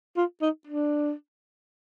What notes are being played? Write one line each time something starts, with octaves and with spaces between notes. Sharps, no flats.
F4
D#4
D4